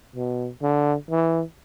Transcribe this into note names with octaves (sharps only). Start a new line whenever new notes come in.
B2
D3
E3